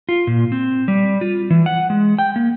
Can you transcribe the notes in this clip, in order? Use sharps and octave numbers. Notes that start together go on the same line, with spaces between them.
F4
A#2
C4
G3
F4
E3
F#5
G#3
G5
A#3